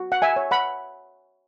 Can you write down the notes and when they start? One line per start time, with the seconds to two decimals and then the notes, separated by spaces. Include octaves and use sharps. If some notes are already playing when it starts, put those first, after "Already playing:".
Already playing: F#4
0.12 F#5
0.22 E5 G#5
0.36 C#5
0.51 F#5 B5